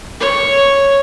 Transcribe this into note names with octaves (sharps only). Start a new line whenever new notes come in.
C#5